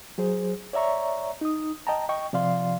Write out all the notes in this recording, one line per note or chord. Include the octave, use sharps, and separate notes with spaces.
F#3 G#4 C5
C#5 D5 E5 A#5 C#6
D#4 D#6
D#5 G5 A5 A#5
D#5 G5 C#6
C3 F3 D5 F5 C6